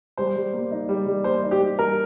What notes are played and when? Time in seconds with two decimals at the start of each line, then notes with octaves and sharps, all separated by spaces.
0.17 G3 C5
0.36 G3
0.53 A#3
0.71 D#4
0.89 G3
1.06 G3
1.24 A#3 C5
1.43 D#4
1.51 G4
1.61 G3
1.79 G3 A#4